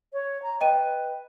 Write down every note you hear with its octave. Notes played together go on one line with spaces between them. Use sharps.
C#5
A#5
B4 D#5 G5 D#7